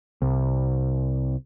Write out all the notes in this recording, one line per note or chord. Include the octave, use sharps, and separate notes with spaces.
C2